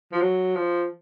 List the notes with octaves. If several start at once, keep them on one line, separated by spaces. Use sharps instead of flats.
F3
F#3
F3